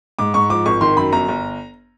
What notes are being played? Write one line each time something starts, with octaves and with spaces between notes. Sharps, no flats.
G#2 D6
G#2 C#6
F3 D6
G#1 C#6
D#3 C6
F#2 B5
G1 A#5
G1